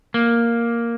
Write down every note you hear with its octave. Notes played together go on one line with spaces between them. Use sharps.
A#3